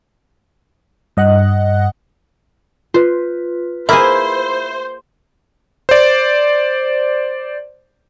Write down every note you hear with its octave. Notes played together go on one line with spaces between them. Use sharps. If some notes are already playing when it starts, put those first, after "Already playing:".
G2 D#5 F#5 F#6
F4 B4 C5
A#3 E4 G#4 C5
C5 D5